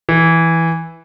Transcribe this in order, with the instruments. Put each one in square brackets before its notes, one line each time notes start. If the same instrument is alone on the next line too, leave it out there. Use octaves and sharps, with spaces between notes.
[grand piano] E3